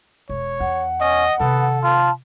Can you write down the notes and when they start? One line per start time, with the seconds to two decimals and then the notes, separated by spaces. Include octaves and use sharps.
0.29 E1 C#5
0.60 E2 F#5
1.01 C#4 D#5
1.40 C3 D#3 B3 A4
1.83 F4 A5